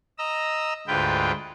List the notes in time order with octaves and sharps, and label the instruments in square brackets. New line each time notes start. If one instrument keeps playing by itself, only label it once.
[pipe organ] D#5 A#5 E6
D2 G#2 F4 B4 G5